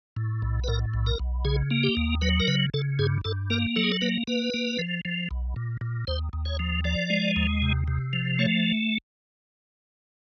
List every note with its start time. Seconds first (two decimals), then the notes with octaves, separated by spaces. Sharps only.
0.16 A2
0.42 B1
0.64 B4
0.68 A2 A#4
0.94 B1
1.07 A#4
1.19 B1
1.45 C#3 G#4
1.71 A#3
1.83 G4
1.97 D#2
2.21 F#3 B4
2.40 A#4
2.48 C#3 B4
2.74 C#3 A4
2.99 G2 G#4
3.25 G2 A4
3.50 A#3 A#4
3.76 F#3 A4
3.84 G#4
3.92 A4
4.01 A#3 B4
4.27 A#3 B4
4.54 A#3
4.79 F3
5.05 F3
5.31 B1
5.56 A#2
5.81 A#2
6.07 D#2 C5
6.33 D#2
6.45 C#5
6.59 F3
6.84 F3 D5
7.10 G#3
7.36 D#2
7.62 C3
7.88 C3
8.13 F3
8.39 A3 C#5